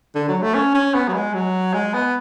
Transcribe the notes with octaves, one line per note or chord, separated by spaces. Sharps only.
D3
F#3
A3
C#4
C#4
B3
F#3
G#3
F#3
G#3
B3